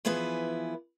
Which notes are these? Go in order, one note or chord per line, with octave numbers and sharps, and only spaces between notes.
E3 F3 B3 E4 G#4 B4